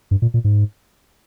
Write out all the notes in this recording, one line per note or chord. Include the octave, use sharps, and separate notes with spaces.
G2
A#2
A#2
G#2